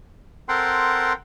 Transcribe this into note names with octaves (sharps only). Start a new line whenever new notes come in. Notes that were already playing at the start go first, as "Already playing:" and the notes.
C4 A4 A#4 F#5 G5 C6